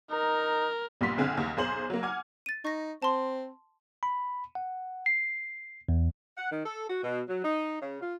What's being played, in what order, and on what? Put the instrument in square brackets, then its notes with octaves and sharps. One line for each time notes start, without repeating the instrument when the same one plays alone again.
[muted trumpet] D#4 [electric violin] A#4
[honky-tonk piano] A#1 A#2 G3 B3 C6 B6
F#1 D3 C4 G#4 F6 F#6
D#2
B1 G#4 C5 F#7
F#3 A#3
F#5 G#5 D6 F6 G#6
[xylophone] A6 D#7
[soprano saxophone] D#4 [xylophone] C#6 A#6
[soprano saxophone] C4 [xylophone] A5 C6
[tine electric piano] B5
F#5
C7
E2
[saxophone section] F#5
D#3
A4
F#4
B2
F#3
D#4
C#3
F4